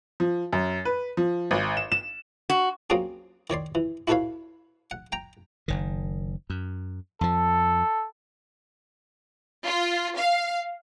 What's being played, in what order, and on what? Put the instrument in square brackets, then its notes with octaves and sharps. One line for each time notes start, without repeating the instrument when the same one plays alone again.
[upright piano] F3
F#2
B4
F3
G#1
E7
E7
[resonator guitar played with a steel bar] F#4
[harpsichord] F#3 A#3 C4 C#4 F#4 G#4
D#3 C#5 D5 C6
E3
E4 F#4 A4 B4 C#5 F5
F#5
G5 A#5
[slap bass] F#1 D#3
F#2
[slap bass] F2 F3 [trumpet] A4
[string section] F4
F5